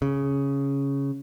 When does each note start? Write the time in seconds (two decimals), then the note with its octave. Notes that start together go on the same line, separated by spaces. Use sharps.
0.02 C#3